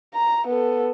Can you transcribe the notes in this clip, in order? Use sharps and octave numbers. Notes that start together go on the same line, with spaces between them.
A#5
B3 A4